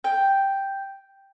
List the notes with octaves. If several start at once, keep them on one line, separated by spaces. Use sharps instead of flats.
G5